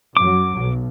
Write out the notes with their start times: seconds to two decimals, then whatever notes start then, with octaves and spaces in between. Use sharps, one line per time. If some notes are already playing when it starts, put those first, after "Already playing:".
0.17 F#2 F#3 D6
0.59 B1